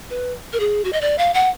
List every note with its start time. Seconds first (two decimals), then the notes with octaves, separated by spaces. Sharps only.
0.10 B4
0.53 A#4
0.60 G#4
0.85 F#4
0.93 D#5
1.01 D5
1.18 F5
1.34 F#5